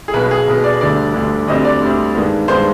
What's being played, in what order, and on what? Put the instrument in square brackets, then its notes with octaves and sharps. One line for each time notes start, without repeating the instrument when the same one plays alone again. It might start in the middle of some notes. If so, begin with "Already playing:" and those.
[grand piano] G#4
B1 B2 B3 B4
G#4
B1 B2 B3
D5
D2 D3 G3 D5
D2 D3 G3
D2 D3 G3 C4 D#5
D5
D2 D3 G3 C4
G2 D#3 G#3 B3
G2 D#3 G#3 B3 C5